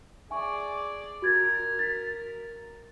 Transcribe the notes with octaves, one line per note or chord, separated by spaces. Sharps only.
G#4 D5 E5 G#5 C#6
F#4 A#4 G#6 A6
A6 B6